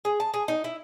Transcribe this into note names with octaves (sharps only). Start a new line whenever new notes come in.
G#4
A5
G#4
D#4
E4